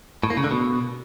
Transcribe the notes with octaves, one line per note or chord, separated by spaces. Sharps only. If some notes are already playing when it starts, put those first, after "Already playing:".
A2
A#3
C#3
D3
B2